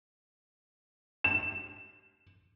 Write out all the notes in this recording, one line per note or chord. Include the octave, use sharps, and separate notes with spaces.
E7